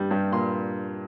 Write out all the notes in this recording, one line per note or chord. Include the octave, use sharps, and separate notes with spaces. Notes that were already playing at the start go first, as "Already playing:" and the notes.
Already playing: G2 G3
G2
A#2 C6